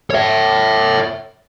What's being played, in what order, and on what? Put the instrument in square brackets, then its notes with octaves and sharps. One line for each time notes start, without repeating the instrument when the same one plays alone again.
[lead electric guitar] C#5 E5